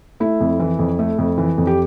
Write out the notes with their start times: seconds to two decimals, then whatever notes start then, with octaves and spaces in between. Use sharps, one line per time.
0.20 A3 E4
0.40 F2
0.60 E3
0.79 F2
0.99 A3
1.19 F2
1.38 E3
1.58 F2
1.67 G4